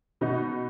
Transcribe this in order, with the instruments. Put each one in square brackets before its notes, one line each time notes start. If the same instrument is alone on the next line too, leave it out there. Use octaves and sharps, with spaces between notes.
[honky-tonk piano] B2 B3 D#4